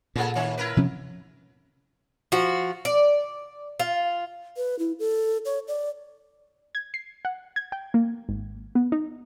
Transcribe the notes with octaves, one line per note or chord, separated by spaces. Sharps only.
A#2 C#3 A#3 A4
D#3 C#4 C#5
E4 A#4 B4
C3 F3 C#4
F3 F#4
D5
F4
B4
E4
A4
C#5
D5
G#6
C7
F#5
G#6
G5
A#3
G#1
B3
D#4